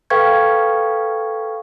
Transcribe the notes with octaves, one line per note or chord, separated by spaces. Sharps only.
A4 B4 F5 G5 C#6 G#6